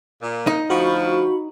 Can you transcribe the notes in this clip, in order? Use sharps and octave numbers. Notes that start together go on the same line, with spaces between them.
A#2
D#4
D2 F3 F#4 B5 C#6